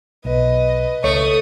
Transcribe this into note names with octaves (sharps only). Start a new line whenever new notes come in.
B1 B4 D#5
C#2 A3 C#5 C#6 D#6